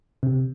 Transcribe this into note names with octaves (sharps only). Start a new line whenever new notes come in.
C3